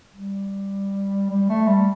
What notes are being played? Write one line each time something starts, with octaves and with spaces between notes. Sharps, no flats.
G3
G3
A3
G3